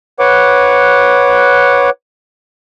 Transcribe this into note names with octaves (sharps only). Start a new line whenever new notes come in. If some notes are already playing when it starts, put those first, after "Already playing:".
B4 C#5 F#5 D6